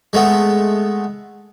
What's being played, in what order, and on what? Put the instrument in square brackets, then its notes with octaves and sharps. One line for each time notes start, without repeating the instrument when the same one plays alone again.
[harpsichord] G#3 A3 B3